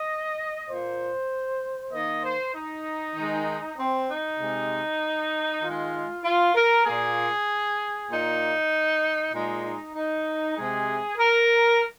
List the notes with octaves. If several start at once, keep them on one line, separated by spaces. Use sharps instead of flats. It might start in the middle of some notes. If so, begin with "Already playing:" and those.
Already playing: D#5
A#2 A#3 C5
D#3 A#3 D#5
C5
D#4
D#3 G#3
C4
D#4
C3 G#3
D#3 G#3 F4
F4
A#4
A#2 A#3 G#4
A#2 A#3 D#4
A#2 G#3 D#4
D#4
D#4
C3 G#3 G#4
A#4